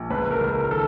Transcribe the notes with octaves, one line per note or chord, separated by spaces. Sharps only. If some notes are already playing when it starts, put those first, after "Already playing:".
Already playing: A#1
C#2 B4
A#4
C#2
A#4
D#3 A4